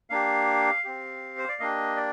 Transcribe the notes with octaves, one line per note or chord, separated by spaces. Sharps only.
A#3 D4 G4 F5
C4 G4
C5
D5
A#3 D4 G4 D#5
D5